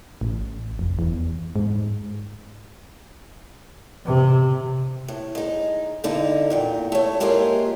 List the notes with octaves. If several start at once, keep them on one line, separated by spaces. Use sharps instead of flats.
A1
F1
E2
G#2
C3
A2
G#3 D#4
G2 D3 D#4 E4
E2 A#2 G5
A3 C#5
G#3 A#3 E4 F4 G4 G#4